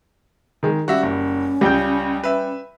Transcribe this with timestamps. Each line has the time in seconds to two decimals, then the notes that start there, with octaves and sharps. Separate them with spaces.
0.63 D#3 G#3
0.88 G3 C#4 F#4 E5
1.03 F#1
1.61 C#2 C#3 G3 G5 G6
2.24 B4 E5